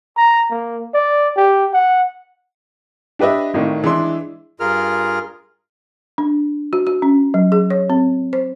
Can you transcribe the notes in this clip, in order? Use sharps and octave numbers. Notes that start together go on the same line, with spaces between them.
A#5
A#3
D5
G4
F#5
D4 G4 B4 D#5 E5
G#1 A2 D#3
E3 G#3 D4 E4 C6
G2 F4 G#4 A#4 F6
D4
F#4
F#4
C#4
F#3
G#4
C#5
C4
C5